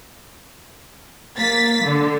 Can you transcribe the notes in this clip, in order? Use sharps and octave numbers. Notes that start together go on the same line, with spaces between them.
A#3 A6 B6
D3